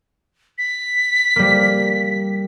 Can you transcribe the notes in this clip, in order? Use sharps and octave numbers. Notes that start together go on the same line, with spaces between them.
B6
G3 A#3